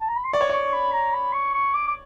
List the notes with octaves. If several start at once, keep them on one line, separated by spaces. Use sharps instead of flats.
A5
A#5
B5
C6
D5 C#6
C#5
D5 C#6
B5
A#5
B5
C#6
C#6
D6
D6